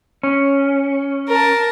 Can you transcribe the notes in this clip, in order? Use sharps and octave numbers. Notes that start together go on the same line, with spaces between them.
C#4
A#4 A5